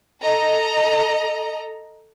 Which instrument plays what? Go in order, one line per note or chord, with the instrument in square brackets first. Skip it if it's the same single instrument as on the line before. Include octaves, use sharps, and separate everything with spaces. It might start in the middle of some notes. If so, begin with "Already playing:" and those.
[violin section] A4 D#5 A#5